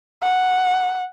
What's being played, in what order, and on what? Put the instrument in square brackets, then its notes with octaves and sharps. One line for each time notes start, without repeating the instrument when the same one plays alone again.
[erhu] F#5